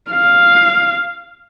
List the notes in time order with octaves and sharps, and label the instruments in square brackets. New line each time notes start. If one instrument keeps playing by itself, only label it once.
[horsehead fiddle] F5